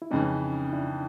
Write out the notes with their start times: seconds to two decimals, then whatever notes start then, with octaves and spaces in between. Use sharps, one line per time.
0.02 E4
0.11 F2 C#3 E3 C#4 D#4
0.73 D4 E4